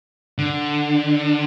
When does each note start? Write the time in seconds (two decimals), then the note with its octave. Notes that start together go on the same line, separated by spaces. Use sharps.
0.38 D3